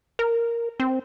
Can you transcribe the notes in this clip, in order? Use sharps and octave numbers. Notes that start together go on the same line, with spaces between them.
A#4
C4